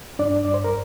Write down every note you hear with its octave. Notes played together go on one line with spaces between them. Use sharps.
G2 D4 D5
G2 D5
C5
A#4